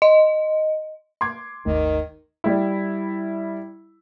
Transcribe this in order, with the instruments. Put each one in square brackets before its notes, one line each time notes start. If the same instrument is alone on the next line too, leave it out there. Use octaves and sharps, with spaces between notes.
[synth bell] D#5
[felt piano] C6 D6 G#6
[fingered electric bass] G#1 D#2 A3 [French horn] D#3
[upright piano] G3 E4